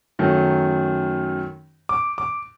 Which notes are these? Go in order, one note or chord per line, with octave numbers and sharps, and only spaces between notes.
F#2 D#3 F#3 A3
D6
D6